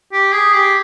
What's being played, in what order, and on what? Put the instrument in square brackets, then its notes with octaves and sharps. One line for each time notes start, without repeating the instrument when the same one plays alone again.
[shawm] G4
G#4
G4